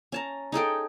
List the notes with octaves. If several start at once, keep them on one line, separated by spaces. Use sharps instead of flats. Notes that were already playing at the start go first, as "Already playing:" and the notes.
C#4 A5 A#5
D#4 G#4 A4 G5